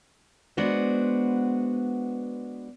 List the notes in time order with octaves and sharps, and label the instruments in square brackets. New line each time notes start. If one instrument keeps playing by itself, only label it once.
[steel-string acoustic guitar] G#3 B3 D4 F#4 B4 C5